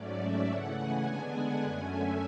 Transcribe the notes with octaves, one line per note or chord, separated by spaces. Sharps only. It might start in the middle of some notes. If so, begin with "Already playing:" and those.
Already playing: G#2 F#3 A3 C#4 D5
E5
C#3 E3 A3 F#5
G#5
D3 G#3 B3 D4
F#5
F#2 D3 A3 C#4 G#5
E5